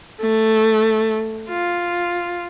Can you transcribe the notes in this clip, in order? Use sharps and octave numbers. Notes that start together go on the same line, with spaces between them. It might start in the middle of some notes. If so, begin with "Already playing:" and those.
A3
F4